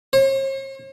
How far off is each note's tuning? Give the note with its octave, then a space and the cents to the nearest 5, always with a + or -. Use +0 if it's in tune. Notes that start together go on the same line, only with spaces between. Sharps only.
C#5 -45